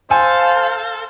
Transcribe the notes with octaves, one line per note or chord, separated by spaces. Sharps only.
A4 C5 F5 G#5